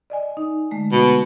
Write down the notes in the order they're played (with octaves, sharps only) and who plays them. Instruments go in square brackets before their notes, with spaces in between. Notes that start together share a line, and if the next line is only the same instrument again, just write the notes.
[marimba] D5 D#5 G#5
D#4
D3 G#3 A3
[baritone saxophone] B2